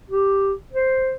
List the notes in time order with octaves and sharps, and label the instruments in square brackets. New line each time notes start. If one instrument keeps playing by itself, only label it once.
[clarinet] G4
C5